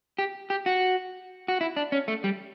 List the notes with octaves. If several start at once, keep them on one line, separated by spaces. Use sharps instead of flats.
G4
G4
F#4
F#4
E4
D4
C#4
A3
G3